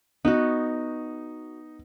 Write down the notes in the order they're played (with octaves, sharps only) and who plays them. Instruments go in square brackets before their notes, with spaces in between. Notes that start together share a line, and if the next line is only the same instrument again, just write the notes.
[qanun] B3 F#4 [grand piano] D#4